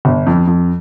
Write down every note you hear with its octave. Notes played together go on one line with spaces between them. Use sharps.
G1
F2
F2